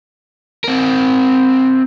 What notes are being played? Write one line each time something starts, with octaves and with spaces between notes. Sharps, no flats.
C4 A#4